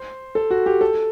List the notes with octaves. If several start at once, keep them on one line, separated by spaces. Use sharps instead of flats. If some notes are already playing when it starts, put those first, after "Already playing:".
Already playing: C5
A4
F#4
G4
A4